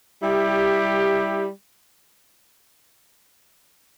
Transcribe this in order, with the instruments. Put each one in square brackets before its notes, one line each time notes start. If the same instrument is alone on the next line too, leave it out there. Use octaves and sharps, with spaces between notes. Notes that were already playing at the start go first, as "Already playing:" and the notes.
[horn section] G3 E4 G4